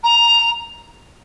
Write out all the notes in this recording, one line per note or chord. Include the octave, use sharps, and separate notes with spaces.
A#5